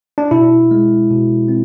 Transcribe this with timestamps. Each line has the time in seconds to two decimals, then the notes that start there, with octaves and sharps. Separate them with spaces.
0.18 D4
0.31 B2 E4
0.71 G#3
1.10 B2
1.48 C4